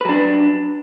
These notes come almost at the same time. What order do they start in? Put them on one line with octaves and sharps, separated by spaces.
B4 F#3 D4